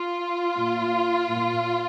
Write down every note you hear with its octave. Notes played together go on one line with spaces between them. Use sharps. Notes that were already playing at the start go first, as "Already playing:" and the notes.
Already playing: F4
A#2
A#2